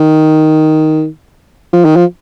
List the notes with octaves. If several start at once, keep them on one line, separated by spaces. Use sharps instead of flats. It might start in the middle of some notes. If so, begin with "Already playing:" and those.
Already playing: D#3
F3
D#3
F3